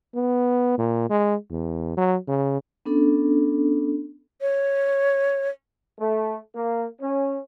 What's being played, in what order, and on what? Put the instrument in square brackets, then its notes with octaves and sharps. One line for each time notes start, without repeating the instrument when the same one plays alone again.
[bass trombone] B3
A#2
G#3
E2
F#3
C#3
[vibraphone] B3 C#4 D4 A4
[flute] C#5
[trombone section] A3
A#3
C#4